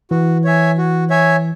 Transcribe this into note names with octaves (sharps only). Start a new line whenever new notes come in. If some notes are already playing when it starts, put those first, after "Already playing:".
E3 F#4
C#5 E5 G#5
F#4
C#5 E5 G#5